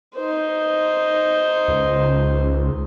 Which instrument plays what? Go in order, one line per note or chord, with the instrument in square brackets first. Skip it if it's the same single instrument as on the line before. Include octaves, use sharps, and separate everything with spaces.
[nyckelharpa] D#4 C5
[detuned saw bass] C#2